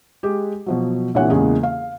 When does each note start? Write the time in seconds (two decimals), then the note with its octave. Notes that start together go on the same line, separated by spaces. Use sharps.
0.23 G#3 G4
0.66 B2 F3 F#3
1.14 C2 A#2 E3 D4 C#5 F#5
1.30 E2 C#3 G#3 A#3
1.63 F5